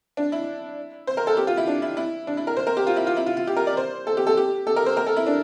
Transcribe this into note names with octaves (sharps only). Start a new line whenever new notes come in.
D4
E4
C5
A#4
A4
G4
F4
E4
D4
E4
E4
D4
E4
A#4
C5
A#4
G4
F4
E4
F4
E4
F4
F4
G4
A#4
D5
C5
A4
G4
A4
G4
A4
A#4
C5
A#4
A4
E4
D4